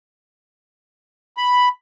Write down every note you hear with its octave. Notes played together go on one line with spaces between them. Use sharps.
B5